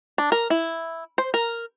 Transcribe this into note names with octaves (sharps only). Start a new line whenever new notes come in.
D4
A#4
E4
C5
A#4